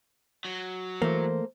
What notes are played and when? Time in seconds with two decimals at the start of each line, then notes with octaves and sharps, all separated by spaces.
0.45 F#3
1.02 E3 A3 A#3 C5